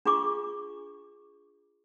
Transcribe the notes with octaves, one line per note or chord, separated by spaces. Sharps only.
D4 F4 G#4 C#6 D6